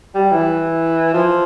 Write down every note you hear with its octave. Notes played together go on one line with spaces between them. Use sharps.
G3
E3
F3